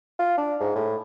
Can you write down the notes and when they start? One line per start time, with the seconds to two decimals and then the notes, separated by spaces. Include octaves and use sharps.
0.19 F4
0.38 D4
0.60 G#2
0.76 A2